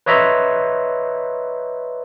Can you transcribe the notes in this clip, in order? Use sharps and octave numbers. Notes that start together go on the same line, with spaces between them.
B4 C#5 D#5 E5 A#5 C6